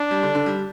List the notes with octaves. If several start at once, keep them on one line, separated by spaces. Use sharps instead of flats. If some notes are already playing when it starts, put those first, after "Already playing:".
Already playing: D4
G3
D3
D3
G3